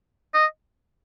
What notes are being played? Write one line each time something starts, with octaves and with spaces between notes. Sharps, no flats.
D#5